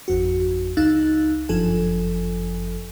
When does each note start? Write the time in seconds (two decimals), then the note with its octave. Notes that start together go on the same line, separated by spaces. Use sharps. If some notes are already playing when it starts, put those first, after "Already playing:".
0.08 G#1 F2 F#4
0.77 C#2 D#4 F5 E6 F#6 A6
1.49 G1 F#2 F3 A4 G#5